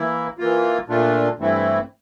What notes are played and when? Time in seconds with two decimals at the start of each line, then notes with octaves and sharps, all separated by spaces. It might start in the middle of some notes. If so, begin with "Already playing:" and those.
Already playing: E3 A#3 E4
0.38 E3 A#3 F4
0.88 A#2 A3 D4 F4
1.39 G2 E3 A3 C4 E4